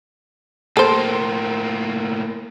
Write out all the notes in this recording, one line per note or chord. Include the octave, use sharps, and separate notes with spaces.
A2 A#3 A4 C5